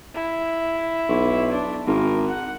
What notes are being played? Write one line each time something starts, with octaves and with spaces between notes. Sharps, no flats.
E4
B1
D4
G#1 A#4
F#5